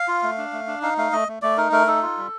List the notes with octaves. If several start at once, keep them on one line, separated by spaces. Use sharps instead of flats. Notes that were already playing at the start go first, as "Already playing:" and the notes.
Already playing: F5
F4
A3
D4
A3
D4
D#4 F5
A3 F5
A3 D#5
A3
A3 D5
D#4 A#4
A3 A#4
D#4 A4
F4
G3